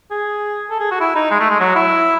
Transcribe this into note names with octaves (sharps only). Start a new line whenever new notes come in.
G#4
A4
G#4
F#4
E4
D#4
G#3
A3
G#3
F#3
E4